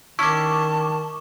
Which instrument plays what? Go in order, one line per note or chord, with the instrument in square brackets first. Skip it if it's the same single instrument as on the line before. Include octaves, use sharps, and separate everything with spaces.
[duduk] D#3 [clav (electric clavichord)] C#4 E4 [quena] A5 [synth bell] C#6 D6